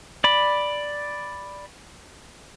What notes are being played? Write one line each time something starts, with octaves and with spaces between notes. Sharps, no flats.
D5 B5